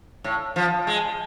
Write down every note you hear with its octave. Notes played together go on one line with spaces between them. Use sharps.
A2
F3
G#3